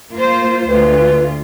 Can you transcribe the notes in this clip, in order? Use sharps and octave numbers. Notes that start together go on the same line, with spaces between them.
A#3 F4 C5
D2 F4 B4